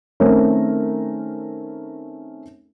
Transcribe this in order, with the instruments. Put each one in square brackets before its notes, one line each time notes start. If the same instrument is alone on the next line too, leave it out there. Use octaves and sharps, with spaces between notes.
[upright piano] D#3 A3 C4 C#4 A#4